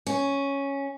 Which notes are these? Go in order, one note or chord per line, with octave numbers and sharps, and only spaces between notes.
C#4